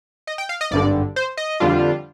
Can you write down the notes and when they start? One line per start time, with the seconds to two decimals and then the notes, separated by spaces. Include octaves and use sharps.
0.27 D#5
0.38 G5
0.49 F5
0.61 D#5
0.71 G#1 G2 D3 D5
1.16 C5
1.37 D#5
1.60 F2 D3 G3 D4 F4